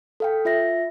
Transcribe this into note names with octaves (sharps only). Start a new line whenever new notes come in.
A4 F5 G5
F4 E5 A#6